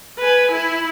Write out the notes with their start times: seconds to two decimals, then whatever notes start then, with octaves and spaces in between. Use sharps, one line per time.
0.18 B4 G#5
0.51 E4